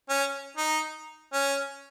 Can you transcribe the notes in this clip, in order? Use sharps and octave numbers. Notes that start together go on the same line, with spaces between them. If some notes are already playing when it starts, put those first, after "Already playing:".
C#4
D#4
C#4